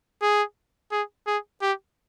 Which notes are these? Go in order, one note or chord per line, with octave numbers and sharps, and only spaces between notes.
G#4
G#4
G#4
G4